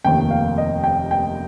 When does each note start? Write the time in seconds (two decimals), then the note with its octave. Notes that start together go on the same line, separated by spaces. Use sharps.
0.04 F1 D#2 D#3 G5
0.31 F5
0.58 D#5
0.84 G5
1.11 G5